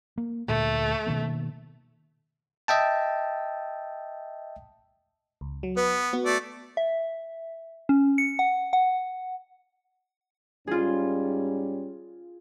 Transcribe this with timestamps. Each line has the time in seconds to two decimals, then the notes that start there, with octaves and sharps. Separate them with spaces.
0.18 A#3
0.48 D2 A#2 A3 A#3
1.07 B2 D#3 A#3
2.68 D#5 E5 G5 A5
5.41 C#2
5.63 F#3
5.77 B3 B4
6.13 B3 F#4
6.25 A3 D5
6.77 E5
7.89 C#4
8.18 C#7
8.39 F#5
8.73 F#5
10.67 G#2 G3 C#4 F4 G#4